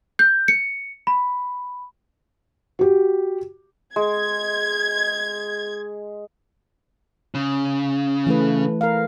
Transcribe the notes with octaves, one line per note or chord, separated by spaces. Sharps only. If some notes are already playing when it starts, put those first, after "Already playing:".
G6
C#7
B5
F#4 G4
G#3 G#6
C#3
E3 A3 B4
A#4 F5